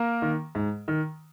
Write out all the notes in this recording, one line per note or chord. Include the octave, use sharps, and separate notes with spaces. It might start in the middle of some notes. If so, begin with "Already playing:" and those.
Already playing: A#3 A#4
D#3
G#2
D#3